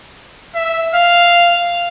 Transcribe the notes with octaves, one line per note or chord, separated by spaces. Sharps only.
E5
F5